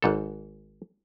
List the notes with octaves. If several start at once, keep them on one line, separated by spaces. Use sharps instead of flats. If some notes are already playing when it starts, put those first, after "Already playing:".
G#1 G#2 A4